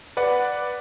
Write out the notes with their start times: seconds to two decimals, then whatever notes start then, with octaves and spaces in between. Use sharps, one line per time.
0.17 B4 D5 F#5